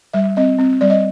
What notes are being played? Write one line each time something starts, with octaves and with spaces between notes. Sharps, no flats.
G3 E5
C4 D#5
C4
G3 D5
D#5